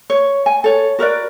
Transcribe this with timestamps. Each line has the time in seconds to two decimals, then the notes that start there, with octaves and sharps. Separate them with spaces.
0.10 C#5
0.46 G#5
0.64 A4 C#5
0.99 F#4 A#4 B4 D5